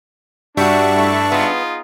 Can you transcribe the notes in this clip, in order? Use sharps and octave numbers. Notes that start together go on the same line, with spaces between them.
G2 G3 D4 F#4 E5 C#6
A3 E4 A4
B3 D#4 F4 G#4